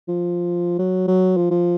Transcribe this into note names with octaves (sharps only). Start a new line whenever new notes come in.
F3
F#3
F#3
F3
F3